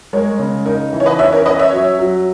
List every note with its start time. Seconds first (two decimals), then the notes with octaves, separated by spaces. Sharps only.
0.13 G#3 A#4 C#5
0.39 C#3
0.66 D#4 A#4
0.93 E3
1.00 C#5
1.06 B4 D#5
1.19 C#4 C#5 E5
1.32 A#4 C#5
1.46 C#4 B4 D#5
1.59 C#5 E5
1.72 F#3
1.99 F#3